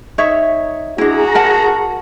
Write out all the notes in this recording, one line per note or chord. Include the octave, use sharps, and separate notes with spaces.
D#4 C#5 E5
D4 E4 F#4 G#4 A#5
A#4 F#5 A5